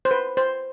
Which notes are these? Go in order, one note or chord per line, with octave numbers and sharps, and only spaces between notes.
C5
B4
C5